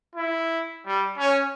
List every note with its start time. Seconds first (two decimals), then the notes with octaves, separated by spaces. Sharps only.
0.15 E4
0.86 G3
1.18 C#4